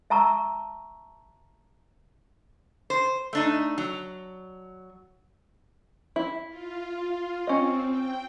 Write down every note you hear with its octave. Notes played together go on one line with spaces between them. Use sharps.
E5 A5 A#5 C#6 E6
C5
A3 D4 D#4
F#3
E4
F4
C4 C#4 D#5
G5